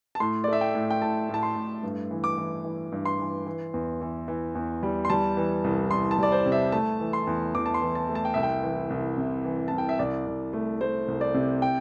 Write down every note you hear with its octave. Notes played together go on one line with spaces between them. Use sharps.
A5
A2 C6
D5
A3 E5
G5
A2
G5
A2 A5
A2 A5
C6
A2
G2
E3
D6
E3
E3
G2
C6
E3
E3
E2
E3
E3
E2
G3
C6
G3 A5
E3
C2
C2 C6
A5
G3 D5
C5
C3
E5
A3 A5
E3
C6
E2
E2 D6
A5
C6
E3
A5
A3
A5
G5
C2 E5
G5
E3
C2
C3
E3
C2 A5
G5
E5
C2 D5
C2
A3
A3 C5
C2
D5
C3
G5